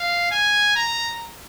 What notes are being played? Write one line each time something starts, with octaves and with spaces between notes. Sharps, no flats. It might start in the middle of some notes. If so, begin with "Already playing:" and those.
Already playing: F5
G#5
A#5